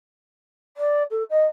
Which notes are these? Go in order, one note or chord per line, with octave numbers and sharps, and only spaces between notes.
D5
A4
D#5